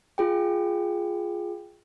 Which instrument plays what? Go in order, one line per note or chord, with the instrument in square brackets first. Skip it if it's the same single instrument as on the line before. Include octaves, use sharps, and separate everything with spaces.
[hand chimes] F4 G#4 G5